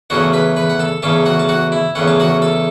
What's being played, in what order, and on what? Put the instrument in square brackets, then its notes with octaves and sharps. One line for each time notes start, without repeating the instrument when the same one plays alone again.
[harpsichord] E2 C#3 A3 C#4 F#4 F#5
B4 B5
B4 B5
F#5
A4 A5
E2 C#3 A3 C#4 A4 A5
F#4 F#5
A5
F#4 F#5
E4
E2 C#3 A3 C#4 F#5
A5
F#4 F#5
A4 A5